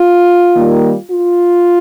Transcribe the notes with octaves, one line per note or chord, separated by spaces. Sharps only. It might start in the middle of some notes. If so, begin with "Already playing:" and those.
Already playing: F4
D#3 G3 A#3
F4